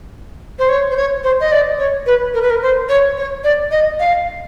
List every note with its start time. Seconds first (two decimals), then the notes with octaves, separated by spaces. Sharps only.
0.59 C5
0.69 C#5
0.91 C5
0.97 C#5
1.23 C5
1.40 D#5
1.52 D5
1.78 C#5
2.06 B4
2.34 A#4
2.42 B4
2.50 A#4
2.62 C5
2.89 C#5
3.17 C#5
3.44 D5
3.71 D#5
4.00 F5